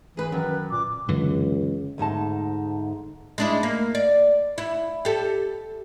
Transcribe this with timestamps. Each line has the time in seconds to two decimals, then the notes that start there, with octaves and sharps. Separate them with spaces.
0.17 E3 G#4 B4
0.32 F#2 D#3 B4
0.71 A#2 D6
1.08 C#2 F#2 D3 E3
1.98 D2 G#2 D#4 A5
3.38 G#3 D4 E4
3.63 A#3
3.95 D5
4.58 E4
5.05 G4 A4